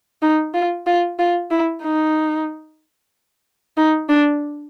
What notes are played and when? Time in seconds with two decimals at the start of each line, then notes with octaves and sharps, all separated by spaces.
0.22 D#4
0.54 F4
0.87 F4
1.19 F4
1.51 E4
1.83 D#4
3.77 D#4
4.09 D4